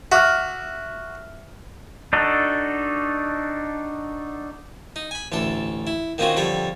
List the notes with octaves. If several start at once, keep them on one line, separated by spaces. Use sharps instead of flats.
F#4 E5 D6 F6
D4 D#4 F#4 A4
D#4
G#5 B5
A1 D2 D4 A4
E4
D#3 A#3 C4 C#4 F4 F#4
F2 D3 G3 C#5 B5